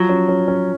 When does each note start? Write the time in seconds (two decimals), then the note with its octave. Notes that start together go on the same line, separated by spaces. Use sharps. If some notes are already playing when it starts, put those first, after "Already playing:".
Already playing: F3 F#3
0.09 C#4
0.29 C#4
0.48 C#4